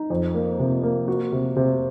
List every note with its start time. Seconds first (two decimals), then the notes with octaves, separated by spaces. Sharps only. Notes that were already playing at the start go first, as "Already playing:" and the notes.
Already playing: D#4
0.10 F2
0.34 A#3
0.59 C3
0.83 A#3
1.08 F#4
1.32 C3
1.56 C3